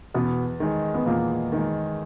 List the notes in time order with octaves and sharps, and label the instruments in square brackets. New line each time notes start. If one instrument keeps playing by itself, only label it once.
[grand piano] E2 [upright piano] B2 B3
[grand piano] D#3 G#3
[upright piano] B3
[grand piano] E2 [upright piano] A#2 A#3
[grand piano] D#3 G#3